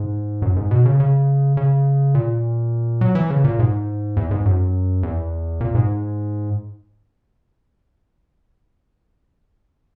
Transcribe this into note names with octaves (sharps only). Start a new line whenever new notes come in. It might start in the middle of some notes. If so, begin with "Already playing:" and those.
Already playing: G#2
F#2
G#2
B2
C#3
C#3
C#3
A#2
F#3
E3
C#3
A#2
G#2
E2
G#2
F#2
E2
A#2
G#2